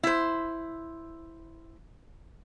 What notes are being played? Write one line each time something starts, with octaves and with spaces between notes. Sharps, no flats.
E4 C5